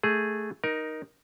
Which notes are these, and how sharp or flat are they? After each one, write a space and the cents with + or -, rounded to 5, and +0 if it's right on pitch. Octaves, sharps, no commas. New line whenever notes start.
A3 +0 G#4 +0
D#4 +0 A#4 +15